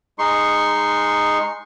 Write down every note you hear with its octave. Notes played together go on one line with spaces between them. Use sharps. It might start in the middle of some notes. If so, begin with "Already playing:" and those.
G#3 D#4 C6 C#6